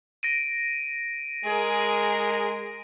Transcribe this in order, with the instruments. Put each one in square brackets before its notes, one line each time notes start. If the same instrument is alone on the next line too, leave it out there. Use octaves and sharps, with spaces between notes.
[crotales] A#6 D7 D#7
[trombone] G#3 [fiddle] G#4 A#4